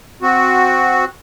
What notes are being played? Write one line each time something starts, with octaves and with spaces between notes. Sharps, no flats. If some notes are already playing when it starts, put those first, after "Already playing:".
C4 F#4